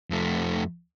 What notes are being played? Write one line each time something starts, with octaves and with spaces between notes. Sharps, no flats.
F2 A3